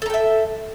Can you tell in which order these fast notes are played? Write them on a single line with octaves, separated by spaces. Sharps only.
A4 A#5 G5 E5